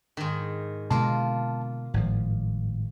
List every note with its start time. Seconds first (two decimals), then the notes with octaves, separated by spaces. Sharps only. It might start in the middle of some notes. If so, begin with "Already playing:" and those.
0.17 G#2 D#3
0.91 B2 D3 G#3 A#3 F4 A5
1.94 G#1 A2 F3